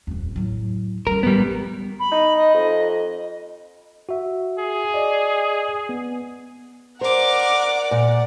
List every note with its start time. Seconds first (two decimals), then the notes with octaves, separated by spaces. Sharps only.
0.07 D#1 F2
0.36 A2 F#3
1.07 G3 C#4 A#4
1.23 A#1 A2 G3 B3
2.00 B5
2.11 D#4
2.37 D#5
2.54 F2
4.09 F#4 E5
4.59 G#4
4.94 D5 D#5
5.89 B3
7.01 A#4 C5 D5 F#5 D6
7.91 A#2